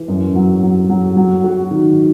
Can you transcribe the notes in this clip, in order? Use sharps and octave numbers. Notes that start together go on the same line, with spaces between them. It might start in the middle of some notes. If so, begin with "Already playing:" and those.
Already playing: E3
F#2
F#3
F#3
F#3
F#3
F#4
D#3